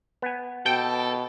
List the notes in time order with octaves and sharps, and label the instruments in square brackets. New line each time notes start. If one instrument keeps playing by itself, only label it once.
[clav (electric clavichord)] B3 G#5
[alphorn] B2 [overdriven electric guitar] A4 [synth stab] G5